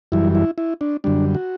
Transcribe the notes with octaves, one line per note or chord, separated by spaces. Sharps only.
F#2 E3 G3 E4
E4
E4
D4
F#2 D3 G3 D4
F#4